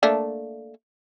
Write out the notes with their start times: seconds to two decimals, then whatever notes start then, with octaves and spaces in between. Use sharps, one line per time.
0.03 A3 A#3 D4